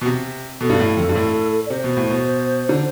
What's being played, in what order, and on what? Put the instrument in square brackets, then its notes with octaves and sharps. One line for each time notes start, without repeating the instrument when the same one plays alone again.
[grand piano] B2
C3
[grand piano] B2 [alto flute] A4
[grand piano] G2
A2
F2
G2
A2
[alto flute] D5
[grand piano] C3 [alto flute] C5
[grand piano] B2
A2
B2
D3